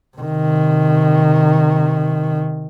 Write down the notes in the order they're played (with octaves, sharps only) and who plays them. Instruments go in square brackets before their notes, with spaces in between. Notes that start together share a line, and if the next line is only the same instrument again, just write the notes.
[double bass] C3 D#3